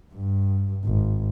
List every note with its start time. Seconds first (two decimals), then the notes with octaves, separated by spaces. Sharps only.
0.14 G2
0.85 G#1